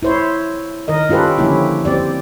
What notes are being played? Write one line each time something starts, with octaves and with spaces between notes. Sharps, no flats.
E4 C5 C#5
D#3 A#4 D#5
C#4 F4 G4 A4 B4
D3 F3 A#3 C#4 E4 G4
C4 G4 D5